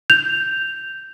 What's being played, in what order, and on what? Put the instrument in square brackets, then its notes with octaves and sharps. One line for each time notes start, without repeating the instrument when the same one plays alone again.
[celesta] G6 F7